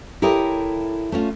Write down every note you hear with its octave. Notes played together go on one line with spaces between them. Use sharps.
E4 G4 A4 A#4 C#5 D#5
A3 C#4 F4